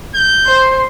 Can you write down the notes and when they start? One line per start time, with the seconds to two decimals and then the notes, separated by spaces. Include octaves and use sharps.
0.15 G6
0.47 C5